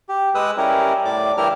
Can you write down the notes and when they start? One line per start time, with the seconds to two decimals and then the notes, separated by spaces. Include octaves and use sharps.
0.09 G4
0.35 G#3 B4 D#6 E6 F#6
0.57 G3 C#4 E4 G4 A#4
1.05 A2 D5 D6
1.37 G2 E3 E4 G4 A#4 F6